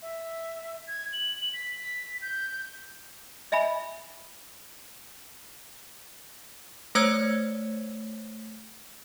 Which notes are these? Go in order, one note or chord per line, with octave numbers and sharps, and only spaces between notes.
E5
G#6
F#7
B6
G6
D#5 E5 G#5 B5
A3 C5 C#5 E6 G#6 C#7